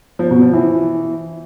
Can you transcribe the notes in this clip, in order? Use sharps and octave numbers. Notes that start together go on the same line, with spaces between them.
F3
B2
F3
E3